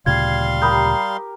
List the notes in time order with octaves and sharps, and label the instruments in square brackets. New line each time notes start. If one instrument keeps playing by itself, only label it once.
[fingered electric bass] D2 A#2 C#3 [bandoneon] G3 F5 C6 [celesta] G#6
[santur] G4 A#4 [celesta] B5 D#6 G6